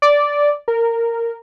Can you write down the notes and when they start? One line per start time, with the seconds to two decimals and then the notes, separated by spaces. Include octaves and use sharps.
0.02 D5
0.68 A#4